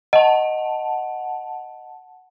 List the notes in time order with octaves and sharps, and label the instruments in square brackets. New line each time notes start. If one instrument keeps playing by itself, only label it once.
[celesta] D#5 [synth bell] F#5 A5